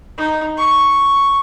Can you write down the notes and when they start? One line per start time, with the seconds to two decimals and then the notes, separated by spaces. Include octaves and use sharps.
0.18 D#4
0.57 C#6